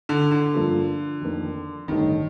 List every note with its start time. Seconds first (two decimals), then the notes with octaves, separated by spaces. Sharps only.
0.09 D3
0.31 D3
0.53 G2 F3 A#3 F4 A4
1.21 F2 D#3 A#3
1.88 A1 G2 D3 D#3 A3 D#4